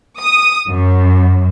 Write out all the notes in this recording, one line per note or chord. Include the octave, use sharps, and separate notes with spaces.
D#6
F#2